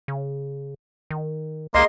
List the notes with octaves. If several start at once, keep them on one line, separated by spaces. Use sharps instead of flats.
C#3
D#3
C#2 A#3 G#4 D#5 C6